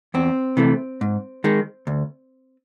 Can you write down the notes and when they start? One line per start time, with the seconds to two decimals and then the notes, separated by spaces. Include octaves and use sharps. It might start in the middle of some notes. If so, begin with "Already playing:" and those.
0.14 E2 C4
0.57 C3 E3 A3
1.01 G#2
1.44 D#3 G#3
1.87 D2